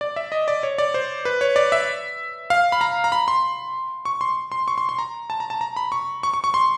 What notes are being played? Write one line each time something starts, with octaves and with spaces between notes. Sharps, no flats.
D5
E5
D#5
D5
C#5
D5
C5
B4
C#5
D5
E5
F5
B5
A#5
A#5
B5
C6
C#6
C6
C6
C#6
C6
C6
A#5
A5
A#5
A5
A#5
B5
C#6
C#6
C#6
C#6
C6